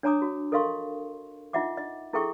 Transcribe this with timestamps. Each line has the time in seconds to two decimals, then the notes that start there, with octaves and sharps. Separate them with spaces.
0.03 D4 C#5 G#5 A#5 D6 D#6
0.22 F#4
0.52 A4 A#4 D#5 F5 C6 C#6
1.53 D#4 F4 D#5 E5 F#5 D6
1.77 D#5
2.13 E4 G#4 A4 E5 G5 C#6